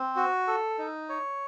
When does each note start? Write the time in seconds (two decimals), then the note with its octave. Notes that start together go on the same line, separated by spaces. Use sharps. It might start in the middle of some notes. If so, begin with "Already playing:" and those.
Already playing: C4
0.16 F#4
0.47 A4
0.79 D#4
1.09 C#5